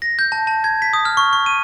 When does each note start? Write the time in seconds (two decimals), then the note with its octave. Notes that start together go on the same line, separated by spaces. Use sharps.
0.02 A#6
0.19 G6
0.32 A5
0.47 A5
0.64 G#6
0.82 B6
0.93 D#6
1.05 F6
1.17 C#6
1.33 C#6
1.46 D#7